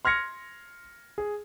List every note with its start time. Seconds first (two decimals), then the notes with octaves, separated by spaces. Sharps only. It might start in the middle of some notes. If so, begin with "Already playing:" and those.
0.05 C6 F6 G#6 A#6 C#7
1.18 G#4